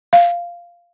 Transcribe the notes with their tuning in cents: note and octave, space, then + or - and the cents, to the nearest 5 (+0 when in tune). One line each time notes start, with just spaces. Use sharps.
F5 -5